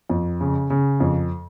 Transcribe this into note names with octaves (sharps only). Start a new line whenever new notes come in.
F2
C#3
C#3
F2